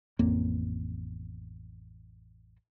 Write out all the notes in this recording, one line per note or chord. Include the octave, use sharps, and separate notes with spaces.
A1 F2 A#3 C4